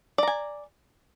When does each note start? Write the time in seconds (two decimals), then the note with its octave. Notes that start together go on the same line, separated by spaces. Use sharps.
0.18 D5
0.23 A#5
0.27 G#5